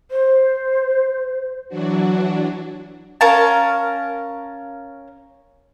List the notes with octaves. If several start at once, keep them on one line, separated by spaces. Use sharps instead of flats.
C5
E3 F#3 D4 F#4
C#4 A#4 F5 A5